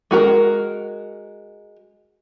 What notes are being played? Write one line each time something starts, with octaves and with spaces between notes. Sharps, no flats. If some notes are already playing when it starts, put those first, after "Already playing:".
G#3 F#4 A#4